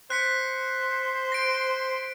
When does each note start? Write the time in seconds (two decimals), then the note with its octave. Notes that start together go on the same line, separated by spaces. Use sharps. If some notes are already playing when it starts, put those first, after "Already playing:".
0.10 C5 F#6 B6 C#7
1.32 A#6 D7